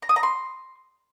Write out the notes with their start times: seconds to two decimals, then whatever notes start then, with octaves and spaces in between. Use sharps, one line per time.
0.02 A#5
0.09 D#6
0.16 A#5
0.23 C6